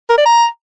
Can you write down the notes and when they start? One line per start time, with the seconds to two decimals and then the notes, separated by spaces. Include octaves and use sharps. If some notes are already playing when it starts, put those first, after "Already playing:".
0.09 A#4
0.17 D5
0.26 A#5